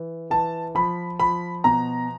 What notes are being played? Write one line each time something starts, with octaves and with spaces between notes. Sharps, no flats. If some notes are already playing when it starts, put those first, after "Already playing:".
Already playing: E3
E3 A5
F3 B5
F3 B5
B2 A#5